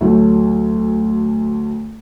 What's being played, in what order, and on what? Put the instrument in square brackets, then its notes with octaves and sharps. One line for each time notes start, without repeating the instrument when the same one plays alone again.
[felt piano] D2 F#3 A3